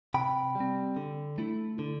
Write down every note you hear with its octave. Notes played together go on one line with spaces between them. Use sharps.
C3 G5 B5
G3
C4
D3
A3 E4
D3